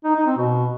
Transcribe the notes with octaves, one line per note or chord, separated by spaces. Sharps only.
D#4
D#4
C4
B2